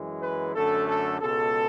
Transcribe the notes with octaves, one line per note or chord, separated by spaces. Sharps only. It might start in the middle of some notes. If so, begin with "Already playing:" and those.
Already playing: F#2 E3 G#3
B4
F#2 D3 A3 A4
A4
C#2 B2 G#3 A4